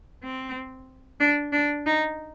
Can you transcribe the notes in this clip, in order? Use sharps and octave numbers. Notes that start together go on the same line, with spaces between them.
C4
D4
D4
D#4